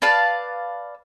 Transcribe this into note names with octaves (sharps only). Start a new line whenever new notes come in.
B4 D5 F5 A5